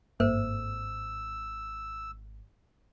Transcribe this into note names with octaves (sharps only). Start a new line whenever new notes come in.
G#1 G2 A#3 A4 C5 E5 E6